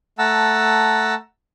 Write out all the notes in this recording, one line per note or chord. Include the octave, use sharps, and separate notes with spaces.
A3 F#5 A5 A#5 E6